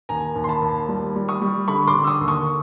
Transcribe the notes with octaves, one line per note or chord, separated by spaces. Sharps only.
D#2 G#5 A#5
D#2
C6
A5 B5
D#2
G3
G3
C#6 D#6
G3
D3 B5 C#6
C6 D6
D3
E6
C#6 D#6
D#2
C#6 D#6